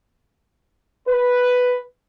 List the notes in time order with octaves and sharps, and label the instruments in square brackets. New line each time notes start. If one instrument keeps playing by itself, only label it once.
[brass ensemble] B4